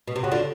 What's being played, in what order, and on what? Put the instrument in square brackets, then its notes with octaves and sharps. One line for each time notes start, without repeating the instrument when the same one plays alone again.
[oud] B2
C3
[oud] C#3 [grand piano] F#4
[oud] D3 [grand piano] F4